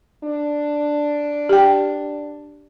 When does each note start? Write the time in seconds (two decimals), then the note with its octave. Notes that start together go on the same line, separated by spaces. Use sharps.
0.24 D4
1.49 G4 G5